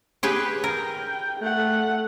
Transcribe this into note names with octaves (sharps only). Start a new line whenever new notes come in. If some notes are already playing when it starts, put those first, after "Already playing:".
G4 G#4 B4
A#4 G5
A3 F#5